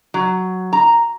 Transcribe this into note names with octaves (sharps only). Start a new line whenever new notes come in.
F#3
A#5